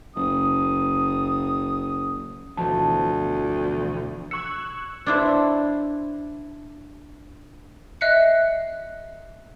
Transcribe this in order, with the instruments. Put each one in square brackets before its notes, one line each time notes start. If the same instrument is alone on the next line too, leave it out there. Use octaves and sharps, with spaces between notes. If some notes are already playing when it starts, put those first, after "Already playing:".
[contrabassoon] F#1 [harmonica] D#6
[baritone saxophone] D2 [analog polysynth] B2 E3 F3 [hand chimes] A5
[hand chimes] C#6 C#7 [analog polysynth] E6 F#6 G#6
[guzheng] D4 E4 C5
[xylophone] D#5 E5 F#6 C7 C#7